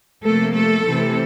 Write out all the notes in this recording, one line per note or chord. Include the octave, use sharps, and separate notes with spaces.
C3 F3 A3 A#3 A4
A3 A4
C3 E3 A3 C4